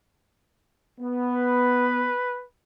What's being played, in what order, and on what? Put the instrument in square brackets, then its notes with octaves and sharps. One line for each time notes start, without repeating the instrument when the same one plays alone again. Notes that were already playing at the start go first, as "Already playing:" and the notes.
[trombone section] B3
[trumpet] B4